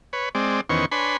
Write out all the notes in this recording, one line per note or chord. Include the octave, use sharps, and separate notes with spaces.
B4 C#5
G#3 C4 D5
E2 D#3 B3 C#4 C5 C#6
D4 B4 C#5 G#5 B5 C6